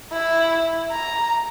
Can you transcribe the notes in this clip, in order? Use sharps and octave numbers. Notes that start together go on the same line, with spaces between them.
E4
A#5